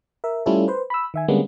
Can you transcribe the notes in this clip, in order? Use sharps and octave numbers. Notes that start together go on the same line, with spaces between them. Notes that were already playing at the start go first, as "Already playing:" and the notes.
A#4 E5
G3 A3 C#4 E4 F4 A4
B4 C5
B5 E6
D#3 E5 G#5
D3 G3 G#3 A#3 B3 C#4